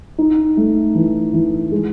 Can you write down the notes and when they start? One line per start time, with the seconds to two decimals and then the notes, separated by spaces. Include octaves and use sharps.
0.18 D#4
0.57 A3
0.95 E3
1.33 E3
1.72 G#3